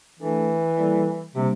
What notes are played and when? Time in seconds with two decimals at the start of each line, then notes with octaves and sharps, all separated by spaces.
0.19 E3 A3 D4 A4
0.77 G3 A#3 E4 A4 D5
1.35 C3 G3 A#3 D4 G4